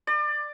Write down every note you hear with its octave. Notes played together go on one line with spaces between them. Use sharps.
D5